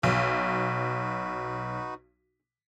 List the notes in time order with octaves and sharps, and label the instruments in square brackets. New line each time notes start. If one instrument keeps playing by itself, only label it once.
[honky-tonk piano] B1 [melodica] D#4 F#4 B4